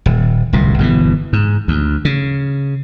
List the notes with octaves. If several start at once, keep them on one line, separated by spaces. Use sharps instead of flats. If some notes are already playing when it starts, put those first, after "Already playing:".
D#1
D1 C2 A#2
G1 B2 D3 E3
G#2
D2
C#3